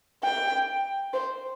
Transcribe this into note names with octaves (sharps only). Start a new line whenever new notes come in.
G5
C5